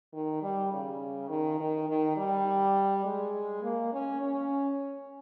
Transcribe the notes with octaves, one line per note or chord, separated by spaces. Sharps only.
D#3
G3
C#3
D#3
D#3
D#3
G3
G#3
A#3
C#4
C#4